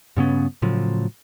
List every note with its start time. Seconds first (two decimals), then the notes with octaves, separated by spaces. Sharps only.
0.17 G2 C#3 B3 C#4
0.62 A2 C#3 F3 F#3